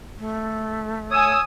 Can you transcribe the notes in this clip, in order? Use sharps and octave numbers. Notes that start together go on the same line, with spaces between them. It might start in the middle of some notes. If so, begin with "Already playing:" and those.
A3
C#5 G#5 D#6 E6